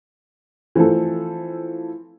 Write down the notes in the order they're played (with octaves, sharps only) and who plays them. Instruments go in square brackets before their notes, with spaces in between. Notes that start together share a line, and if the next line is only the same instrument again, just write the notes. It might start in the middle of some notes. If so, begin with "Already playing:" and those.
[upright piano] E3 F3 A3 C4 A4